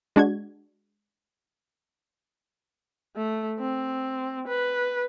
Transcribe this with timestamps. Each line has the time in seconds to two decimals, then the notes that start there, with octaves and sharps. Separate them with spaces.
0.16 G#3 D4 F#4 G#6
3.16 A3
3.60 C4
4.47 B4